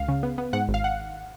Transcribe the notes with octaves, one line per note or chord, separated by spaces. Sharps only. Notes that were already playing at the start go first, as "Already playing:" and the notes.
Already playing: C#2 F5
C#3
B3
B3
G#2 F#5
G#1
F5
F#5